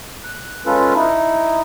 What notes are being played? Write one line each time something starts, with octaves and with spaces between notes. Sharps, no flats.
F#6
G#3 C#4 F4 A4 B4
D#4 E4